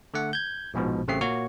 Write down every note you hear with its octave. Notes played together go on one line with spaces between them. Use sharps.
D3 A3 F#5
G6 G#6
A#1 G#2 B2 F3
A1 C#3 A3 C4 G4 C7
A#2 A#3 F#4 C#5 C#6